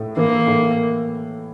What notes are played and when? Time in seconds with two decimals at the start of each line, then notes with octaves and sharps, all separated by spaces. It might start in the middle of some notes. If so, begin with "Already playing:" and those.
Already playing: A2 A3
0.17 E3 A#3
0.47 A2